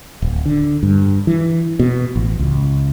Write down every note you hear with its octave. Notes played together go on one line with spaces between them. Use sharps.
D1
D3
G2
E3
B2
A1
C#2